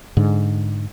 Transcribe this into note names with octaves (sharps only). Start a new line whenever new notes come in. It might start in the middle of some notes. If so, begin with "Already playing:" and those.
G#2 D3